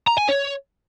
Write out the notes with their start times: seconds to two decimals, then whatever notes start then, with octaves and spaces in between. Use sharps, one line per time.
0.08 A#5
0.18 G#5
0.29 C#5